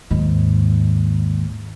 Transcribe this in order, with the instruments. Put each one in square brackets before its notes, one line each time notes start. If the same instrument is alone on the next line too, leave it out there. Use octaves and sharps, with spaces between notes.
[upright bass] D#2 G#2